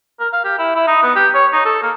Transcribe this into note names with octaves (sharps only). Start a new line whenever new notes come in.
A#4
F5
G4
E4
E4
D#4
B3
G4
C#5
D#4
A4
A#3